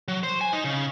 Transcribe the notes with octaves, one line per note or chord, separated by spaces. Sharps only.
F#3
C5
G#5
D#4
C#3